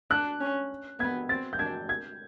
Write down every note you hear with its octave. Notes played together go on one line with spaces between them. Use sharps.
D4 F#6
C#4
B3 G#6
C4 A6
G6
D4 G#6
G#6